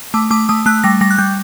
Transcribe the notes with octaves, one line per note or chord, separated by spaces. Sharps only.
A3 D6
A3 D6
A3 D#6
A3 F#6
G3 A#6
G3 A#6
F#6
G3 G6